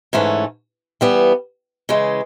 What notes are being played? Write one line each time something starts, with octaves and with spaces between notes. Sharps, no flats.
G#2 E3 A3 C#4
E3 G3 B3
C#3 E3 G#3